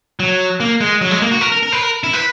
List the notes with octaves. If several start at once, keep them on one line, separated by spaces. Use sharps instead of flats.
F#3
A#3
G#3
F#3
G#3
A#3
F#4
A#4
A#4
A#4
B4
A#4
E4
B4